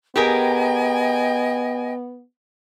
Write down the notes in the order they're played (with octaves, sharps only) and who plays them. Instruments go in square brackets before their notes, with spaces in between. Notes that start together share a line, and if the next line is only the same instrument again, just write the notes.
[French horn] B3 [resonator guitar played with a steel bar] G4 G#4 A#4 [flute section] D#5 G5 G#5